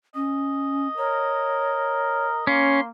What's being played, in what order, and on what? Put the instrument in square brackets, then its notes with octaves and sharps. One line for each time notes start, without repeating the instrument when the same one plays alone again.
[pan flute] C#4 [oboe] D#5
[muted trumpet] A#4 [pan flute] C#5
[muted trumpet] A#3 [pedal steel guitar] C#4 [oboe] C6